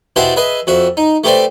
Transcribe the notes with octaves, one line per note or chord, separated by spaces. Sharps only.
B2 E4 G4 C5 F#5 A5
G#4 B4 D#5 E5
F2 F#4 E5
D#4
A3 G4 A4 B4 C5 D5